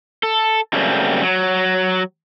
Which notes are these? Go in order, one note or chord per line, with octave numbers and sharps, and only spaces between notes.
A4
C#3 F#3 G3 A3 A#3 C4
F#3